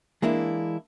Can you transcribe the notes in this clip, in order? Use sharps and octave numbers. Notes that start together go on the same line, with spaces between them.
E3 G#3 A#3 D4 E4